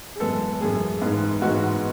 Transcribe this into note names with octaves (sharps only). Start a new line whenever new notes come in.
G#4
F#2 E3 G#3 B3 A4
F#2 E3 G#3 B3 G#4
G#2 E3 G#3 B3
G#2 E3 G#3 B3 F#4